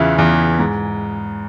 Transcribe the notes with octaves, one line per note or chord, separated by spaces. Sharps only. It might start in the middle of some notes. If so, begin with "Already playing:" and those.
Already playing: E2 C#3 E3 E4 F4
E2
G#2